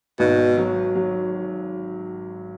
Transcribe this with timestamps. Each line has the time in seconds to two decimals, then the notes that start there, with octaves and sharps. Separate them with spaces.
0.19 G#1 B2
0.57 F#3
0.96 F#3